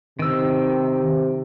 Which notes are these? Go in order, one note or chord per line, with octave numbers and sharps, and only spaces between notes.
C3 D#3 E6